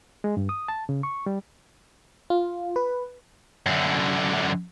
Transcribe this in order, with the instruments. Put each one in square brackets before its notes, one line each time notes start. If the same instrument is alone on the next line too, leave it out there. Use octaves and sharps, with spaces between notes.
[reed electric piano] G#3
G2
D#6
A5
C#3
C#6
G3
[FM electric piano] F4
B4
[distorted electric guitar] F#2 D3